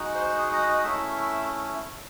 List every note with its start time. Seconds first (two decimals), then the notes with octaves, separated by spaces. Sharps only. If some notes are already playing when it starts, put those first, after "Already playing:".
Already playing: G#3 D#4 F#4
0.15 C5
0.38 G#4
0.53 D#5
0.69 D#5
0.84 A3 C#4 E4 E5